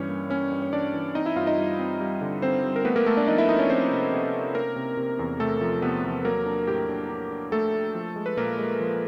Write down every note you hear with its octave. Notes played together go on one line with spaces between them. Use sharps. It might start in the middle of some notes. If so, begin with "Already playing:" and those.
Already playing: G2 E3 G3 C#4 C#5
A#3
A#3 C#4 C#5
G2
C#5
E3 D4 D5
E3
C4 D#4 D#5
E4 E5
G2 F4 F5
D#4 D#5
G3
C4
G3
D3
D3 C4 C5
G3
A#4
A3 B3 B4
A#3 A#4
A3 A4
D4 D5
F3 D#4 D#5
E4 E5
F3 D#4 D#5
C#4 C#5
F3 C4 C5
C3
C3
C#4
C3 A#3 A#4
C3
C3
E2
C3 A3 A4
F3
C3 B3 B4
E2
F#3 A#3 A#4
D4
A2 G4
D4
D4
D4
A3 A#3 A4
D4
F3
G#3
B4
A#2 A#3 A#4
G#3
F3